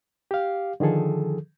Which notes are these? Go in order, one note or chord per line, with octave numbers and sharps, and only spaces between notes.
G4 F5
D3 D#3 F3 G#4 A4